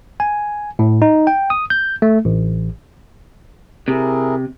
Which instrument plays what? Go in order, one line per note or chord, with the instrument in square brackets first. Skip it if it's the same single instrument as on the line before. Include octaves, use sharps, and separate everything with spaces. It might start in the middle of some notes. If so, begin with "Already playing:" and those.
[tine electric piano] G#5
A2
D#4
G5
D#6
G6
A3
A1
[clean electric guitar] C3 [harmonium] E4 G#4 A#4